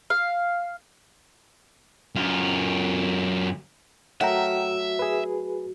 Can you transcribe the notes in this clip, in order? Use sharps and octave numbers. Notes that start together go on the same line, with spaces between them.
F5
F#2 F4
F#3 A3 F#4 A#4 E5 F#5 G5 A#5
G#4 B4